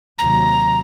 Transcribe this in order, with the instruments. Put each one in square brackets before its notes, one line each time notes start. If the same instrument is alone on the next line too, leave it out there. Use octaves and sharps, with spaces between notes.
[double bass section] D#2 C3 F#3 [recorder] A#5